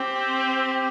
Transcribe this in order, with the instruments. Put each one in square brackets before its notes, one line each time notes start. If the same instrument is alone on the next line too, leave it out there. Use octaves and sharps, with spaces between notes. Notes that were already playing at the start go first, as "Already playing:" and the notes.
Already playing: [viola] C4 [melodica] G4